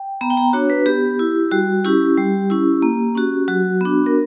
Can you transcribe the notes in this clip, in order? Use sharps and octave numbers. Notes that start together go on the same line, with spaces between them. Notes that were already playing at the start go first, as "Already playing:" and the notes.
Already playing: G5
B3 A#5
G5
A#5
D4 F#4 C#5
B4
B3 G4
E4
G3 F#4
C#4 E4 G4
G3
C#4 E4
A#3
C#4 F#4
F#3 F#4
B3 D4
A#4